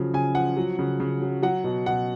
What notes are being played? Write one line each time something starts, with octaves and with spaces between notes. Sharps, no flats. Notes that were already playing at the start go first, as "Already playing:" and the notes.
Already playing: C#3 F3 F#3
C#3 G#5
F3 F#5
F#3
C#3
C#3
F#3
F#3 F#5
B2
B2 F#5